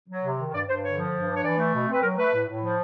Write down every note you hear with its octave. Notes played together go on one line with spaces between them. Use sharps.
F#3
C3
D#3
G2 D5
G2 C5
D3 C#5
F3
G2
D4
C#5
E3 D5
A3
B2
C4
B4
F#3 A#4
A3 B4
A2
A2
F3